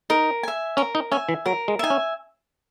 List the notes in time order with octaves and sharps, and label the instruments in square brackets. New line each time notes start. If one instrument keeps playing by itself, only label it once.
[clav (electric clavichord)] D#4 [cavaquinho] A#4
[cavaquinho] E5 G#5
[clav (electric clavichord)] C#4 [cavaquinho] A#4
[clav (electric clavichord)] D#4
[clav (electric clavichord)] C#4 [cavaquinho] E5 G#5
[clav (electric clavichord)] E3
[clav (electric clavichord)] F#3 [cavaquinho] A#4
[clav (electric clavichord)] G#3
[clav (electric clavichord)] D#4 [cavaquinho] E5 G#5
[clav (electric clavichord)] C#4